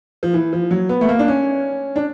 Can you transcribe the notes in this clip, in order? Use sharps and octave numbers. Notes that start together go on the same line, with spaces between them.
F3
E3
F3
F#3
B3
A3
A#3
D4
C#4
D4